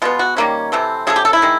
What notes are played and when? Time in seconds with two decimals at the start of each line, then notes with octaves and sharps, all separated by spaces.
0.02 B2 G#3 B3 F4
0.19 F#4
0.37 D#3 G3 A#3 C#4
0.72 C3 E3 A3 C4
1.07 C#3 F3 A3 G#4
1.16 G4
1.25 A4
1.33 E4
1.42 D#3 G#3